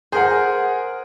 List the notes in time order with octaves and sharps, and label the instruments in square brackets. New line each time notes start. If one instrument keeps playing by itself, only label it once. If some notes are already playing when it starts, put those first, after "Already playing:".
[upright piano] G#4 A#4 [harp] C5 F#5